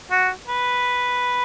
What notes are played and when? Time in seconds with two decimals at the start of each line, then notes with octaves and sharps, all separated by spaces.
0.11 F#4
0.47 B4